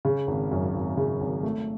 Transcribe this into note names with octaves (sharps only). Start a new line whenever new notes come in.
C#3
G#1
F#2
G#1
C#3
G#1
A3